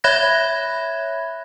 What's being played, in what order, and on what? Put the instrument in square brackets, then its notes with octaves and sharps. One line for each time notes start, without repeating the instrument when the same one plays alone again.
[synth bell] C#5 E5 B5 F#6 G#6 A#6